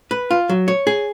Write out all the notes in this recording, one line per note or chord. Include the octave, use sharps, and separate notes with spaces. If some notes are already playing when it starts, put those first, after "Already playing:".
B4
F4
F#3
C#5
G#4